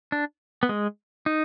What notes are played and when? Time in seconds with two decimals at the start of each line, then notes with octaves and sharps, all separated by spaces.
0.12 D4
0.63 B3
0.69 G#3
1.26 D#4